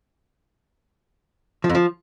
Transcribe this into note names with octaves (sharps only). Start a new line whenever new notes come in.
F3
F2
F3